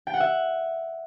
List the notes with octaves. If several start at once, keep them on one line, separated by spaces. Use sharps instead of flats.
G5
F#5
E5